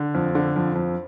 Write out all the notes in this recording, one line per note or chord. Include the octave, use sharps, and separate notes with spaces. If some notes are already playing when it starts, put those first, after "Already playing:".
Already playing: D3
F2
D3
F2
F2